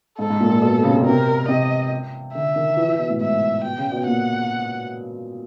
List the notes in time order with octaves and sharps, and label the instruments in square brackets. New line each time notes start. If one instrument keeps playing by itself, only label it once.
[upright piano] G#2 [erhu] A4
[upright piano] G#2
A#2
A#2
B2
C#3
C3
B2
[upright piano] C3 [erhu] A#4
[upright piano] C3 [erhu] D#5
[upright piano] D3 [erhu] E5
[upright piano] D#3
E3
E3
B2
A2
[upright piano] G#2 [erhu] E5
[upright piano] B2 [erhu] G5
[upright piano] C#3
B2
[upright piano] A#2 [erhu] F#5